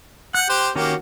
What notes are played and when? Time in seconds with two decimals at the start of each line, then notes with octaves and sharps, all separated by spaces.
0.34 F#5 F#6 G6
0.49 G4 C5
0.76 D#3 A#3 C#4 F#4 G4